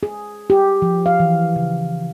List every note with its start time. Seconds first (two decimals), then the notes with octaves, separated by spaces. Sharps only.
0.03 G#4
0.50 G4
0.82 F3
1.06 F5
1.20 E3
1.56 C#3